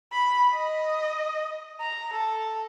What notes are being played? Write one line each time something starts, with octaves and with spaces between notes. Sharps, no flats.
B5
D#5
A#5
A4